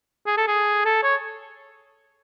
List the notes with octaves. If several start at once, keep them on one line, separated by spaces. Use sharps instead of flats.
G#4
A4
G#4
A4
C#5